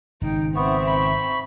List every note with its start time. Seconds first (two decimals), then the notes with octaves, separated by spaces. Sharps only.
0.21 G#1 C#3 D#4 G5
0.56 B3 C4 E5 C#6
0.87 B5